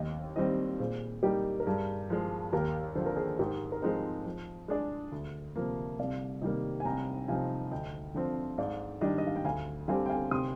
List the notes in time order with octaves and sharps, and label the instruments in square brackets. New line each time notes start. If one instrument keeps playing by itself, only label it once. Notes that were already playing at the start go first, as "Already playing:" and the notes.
Already playing: [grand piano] D#2 [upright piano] D#5 G5
[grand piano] D#3 G3 C4 [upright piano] C5 D#5
[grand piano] A#2 [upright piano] G#4 C5
[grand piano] G3 A#3 D#4 [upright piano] G4
[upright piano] A#4
[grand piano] G2 [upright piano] G#4
[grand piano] F3 G#3
[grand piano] D#2 [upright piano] G4 A#4
[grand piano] D3 F3 [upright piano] C5
[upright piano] A#4
G#4 C5
[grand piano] G#2 [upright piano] G4 A#4
[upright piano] A#4
[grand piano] F3 G#3 C4 D#4 [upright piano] G#4 C5
[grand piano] F3
G#3 D4 G#4 D5
D2
C3 F3 A#3
[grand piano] C2 [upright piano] D5 F5
[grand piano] C3 D#3 G3 A#3 [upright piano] D#5 G5
[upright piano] G#5
[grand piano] C2 [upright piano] G5 A#5
[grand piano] C3 F3 C4 D#4 [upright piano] F5 G#5
[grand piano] D2 [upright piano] D#5 G5
[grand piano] D3 F3 C4
[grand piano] G#2 [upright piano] D5 F5
[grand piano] D#3 G3 D4 [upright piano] D#5 G5
[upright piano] D#5
F5
G5
[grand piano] D2 [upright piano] F5 G#5
[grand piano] D3 G3 C4 G4 [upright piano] F5 G#5
[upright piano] G5
F5 G#5
[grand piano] C3 [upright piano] C6 D#6